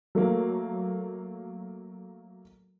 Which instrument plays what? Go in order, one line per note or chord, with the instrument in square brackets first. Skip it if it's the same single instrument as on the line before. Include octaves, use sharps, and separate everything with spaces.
[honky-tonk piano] F#3 A3 A#3